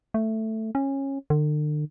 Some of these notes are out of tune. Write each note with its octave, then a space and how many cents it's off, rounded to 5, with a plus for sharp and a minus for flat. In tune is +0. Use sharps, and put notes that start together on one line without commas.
A3 +5
C#4 -20
D3 +40